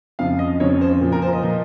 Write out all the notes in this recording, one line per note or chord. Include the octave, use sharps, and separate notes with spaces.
F2 C#3 F3 F5
D#5
F2 C#3 F3 C#5
C5
A#2 F3
A#4
C5
D#5
A#2 F3